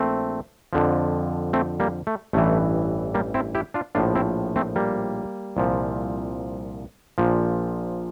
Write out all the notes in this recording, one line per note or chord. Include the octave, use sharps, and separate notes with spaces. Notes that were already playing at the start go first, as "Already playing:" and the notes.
Already playing: A#1 A3 C4
F2 D3 F3
A3 C4
G3 A#3
A3
A1 G2 E3 A3
G3 A#3
C4 E4
E4 G4
D4 F4
A#1 A2 F3 D4 F4
C4 E4
A3 C4
G3 A#3
C2 A#2 F3
A#1 A#2 F3